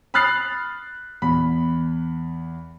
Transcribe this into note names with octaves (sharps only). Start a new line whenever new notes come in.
B5 D#6 F6 F#6 A6 C7
E2 B5